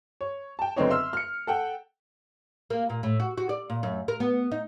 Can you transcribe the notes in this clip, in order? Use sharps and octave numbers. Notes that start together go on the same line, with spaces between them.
C#5
G5 A5
F#1 D3 B3 C4 D#4 C#5
E5 C6 E6 F6
F6 C#7
A4 F#5 G5
A#3
A#2
A2
F#4
F#4
D5
A#2
F#2
A#4
B3
D#4